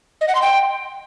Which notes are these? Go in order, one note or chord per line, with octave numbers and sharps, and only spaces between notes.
D#5
F#5
C6
G5